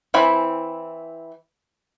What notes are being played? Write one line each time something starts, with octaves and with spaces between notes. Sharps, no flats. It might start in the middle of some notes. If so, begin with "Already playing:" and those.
E3 C4 E4 G#5 B5